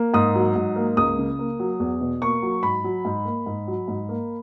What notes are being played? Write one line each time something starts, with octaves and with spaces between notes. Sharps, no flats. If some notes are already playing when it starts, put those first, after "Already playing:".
Already playing: A#3
G#2 D#6
F#3
G#2
A#3
C#2 D#6
C#3
A#3
F#3
E2
B2
A#3 C#6
F#3
G#2 B5
F#3
G#2
A#3
G#2
F#3
G#2
A#3